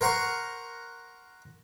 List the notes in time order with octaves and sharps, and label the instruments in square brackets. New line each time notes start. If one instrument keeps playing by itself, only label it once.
[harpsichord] A#4 C5 F#5 A#5 C#6